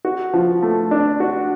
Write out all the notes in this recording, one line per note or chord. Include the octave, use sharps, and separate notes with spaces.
F#4
F3
A3
D4
F#4